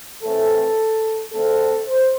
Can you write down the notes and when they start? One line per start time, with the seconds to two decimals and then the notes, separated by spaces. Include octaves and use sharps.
0.23 A2 E3 A3 C4 A4
1.33 D3 A3 C4 A4
1.89 C5